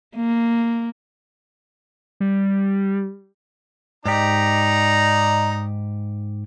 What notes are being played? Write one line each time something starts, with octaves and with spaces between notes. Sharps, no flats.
A#3
G3
G#2 D#4 G4 D5 A#5